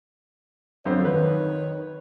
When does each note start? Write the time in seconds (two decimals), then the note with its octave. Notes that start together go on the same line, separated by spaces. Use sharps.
0.85 F2 D3 F#3 C5 C#5
1.05 D#3 B4